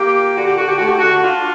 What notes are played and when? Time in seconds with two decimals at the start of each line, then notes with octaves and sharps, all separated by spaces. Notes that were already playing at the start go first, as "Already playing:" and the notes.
Already playing: A#3 G4
0.16 A#2
0.36 D3 F#4
0.46 G4
0.57 D3 F#4
0.66 G4
0.77 A3 F#4
0.87 G4
0.98 D3 F#4
1.22 D4 F4